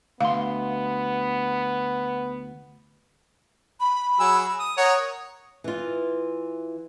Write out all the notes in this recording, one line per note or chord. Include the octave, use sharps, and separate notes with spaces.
D2 B3 F5 C6
B5
F#3 G#4 E6
D#6
A#4 C#5 F#5 D#6
E3 F4